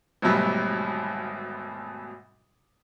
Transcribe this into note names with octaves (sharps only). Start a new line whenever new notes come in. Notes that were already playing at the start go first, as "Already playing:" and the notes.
G#1 D2 B2 F#3 G3